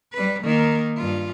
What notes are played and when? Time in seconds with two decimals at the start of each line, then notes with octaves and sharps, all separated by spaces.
0.13 G3 B4
0.43 D#3 A#3
0.98 G2 F4